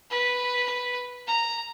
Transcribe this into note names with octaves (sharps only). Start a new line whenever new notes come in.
B4
A#5